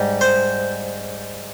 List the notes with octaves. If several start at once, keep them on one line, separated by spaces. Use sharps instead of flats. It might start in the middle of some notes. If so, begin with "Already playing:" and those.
Already playing: G#2 G3
C5